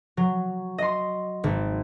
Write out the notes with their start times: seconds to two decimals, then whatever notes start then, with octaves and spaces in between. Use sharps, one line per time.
0.17 F#3
0.78 D#5 C6
1.44 G#1